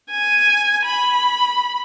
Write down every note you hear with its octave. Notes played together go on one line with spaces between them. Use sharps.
G#5
B5